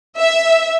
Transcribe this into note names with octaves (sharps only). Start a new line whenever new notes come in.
E5